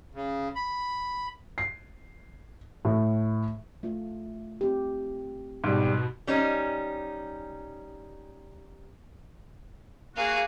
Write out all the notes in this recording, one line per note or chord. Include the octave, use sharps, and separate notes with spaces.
C#3
B5
C7
A2
A3 F4
C4 G4
G#2 B2 G3
G3 C#4 D#4
A#3 F#4 G#4 F5